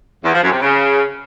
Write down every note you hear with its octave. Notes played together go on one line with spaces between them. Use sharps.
E2
F3
F#2
C3
C#3